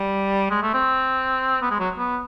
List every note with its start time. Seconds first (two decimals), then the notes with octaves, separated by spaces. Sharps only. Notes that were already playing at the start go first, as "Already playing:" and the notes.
Already playing: G3
0.50 G#3
0.62 A3
0.74 C4
1.61 B3
1.71 G#3
1.79 F#3
1.98 B3